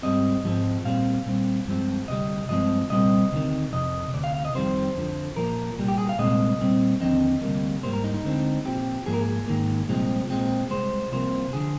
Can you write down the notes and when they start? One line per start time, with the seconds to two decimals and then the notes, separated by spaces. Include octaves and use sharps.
0.03 G#2 G3 C4 D#5
0.43 G#2 F3 G#3 C4
0.85 A#2 G3 C4 F5
1.26 A#2 G3 C4
1.67 G2 F3 G#3 C4
2.08 D2 C3 G3 D#5
2.49 G2 F3 G#3 C4 D#5
2.90 C2 A#2 G3 C4 D#5
3.31 D2 C3 D#3
3.72 F2 C3 D#5
4.14 D2 C3 D5
4.24 F5
4.34 F5
4.45 D#5
4.55 F2 D#3 G3 C4 C5
4.95 F2 D3 F3
5.36 A#2 F3 A#3 A#4
5.78 C2 A#2 G3
5.88 G4
5.98 G#4
6.09 F5
6.18 C2 A#2 G#3 C4 D#5
6.60 A#2 G3 C4
7.01 D#2 D3 F3 C4 D#5
7.42 D2 C3 G3 A#3
7.83 G#2 G3 A#3 C5
7.93 A#4
8.04 D#4
8.14 D#4
8.24 D2 D3 G#3 C4
8.65 A#2 F3 C4 G4
9.06 G#2 F3 A#3 G#4
9.14 A#4
9.21 G#4
9.48 G#2 D#3 A#3
9.88 C2 A#2 F3 G#3 C4
10.30 A#2 G#3 C4
10.70 A#2 G#3 C5
10.75 C2
11.12 C2 C3 F3 A#3 C5
11.53 D3 F3 G#4